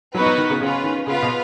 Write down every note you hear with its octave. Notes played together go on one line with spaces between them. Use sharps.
F#3 B3 D#4 F#4 B4
F#3
D#3
C#3
C#3 C#4 F4 B4
D#3
C#3 B3 F4 B4 F5
B2